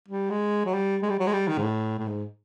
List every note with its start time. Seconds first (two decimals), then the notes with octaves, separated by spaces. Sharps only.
0.08 G3
0.30 G#3
0.65 F#3
0.74 G3
1.02 G#3
1.10 G3
1.19 F#3
1.27 G#3
1.33 G3
1.48 D#3
1.58 G#2
1.63 A2
1.98 A2
2.08 G#2